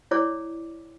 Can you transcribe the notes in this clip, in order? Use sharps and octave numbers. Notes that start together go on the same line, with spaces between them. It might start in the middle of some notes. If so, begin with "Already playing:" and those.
E4 C#5 D5 D6